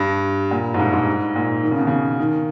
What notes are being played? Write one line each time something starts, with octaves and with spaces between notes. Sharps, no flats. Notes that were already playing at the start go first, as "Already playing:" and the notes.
Already playing: G2
A#2
G#2
G2
G#2
A#2
D#3
C#3
B2
C#3
D#3